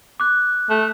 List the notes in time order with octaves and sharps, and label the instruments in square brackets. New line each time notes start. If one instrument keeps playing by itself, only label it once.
[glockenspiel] D6 F#6
[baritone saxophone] A3